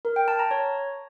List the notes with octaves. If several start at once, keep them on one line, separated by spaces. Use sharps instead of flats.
A#4
G5
A5
A#5
C#5